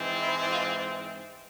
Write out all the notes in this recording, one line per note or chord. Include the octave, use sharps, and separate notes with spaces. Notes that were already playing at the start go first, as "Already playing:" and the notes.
Already playing: G#2 E3 G#3 C4
E4
F4